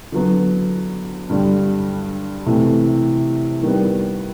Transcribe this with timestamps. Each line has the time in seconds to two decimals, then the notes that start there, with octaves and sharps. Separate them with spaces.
0.12 D3 F#3 B3
1.29 G2 D3 G3
2.46 C3 E3 A3
3.63 D#3 G3 B3